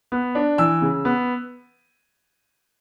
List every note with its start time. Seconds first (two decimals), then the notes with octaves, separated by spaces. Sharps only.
0.12 B3
0.35 D4
0.58 E3 E6
0.82 C#3
1.05 B3